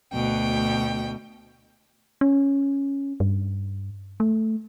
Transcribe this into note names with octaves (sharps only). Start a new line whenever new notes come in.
D2 B2 G5
C#4
G2
A3